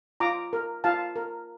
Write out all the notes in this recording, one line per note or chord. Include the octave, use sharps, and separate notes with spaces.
F4 A#5 D6
A#4
F4 F5 A5
A#4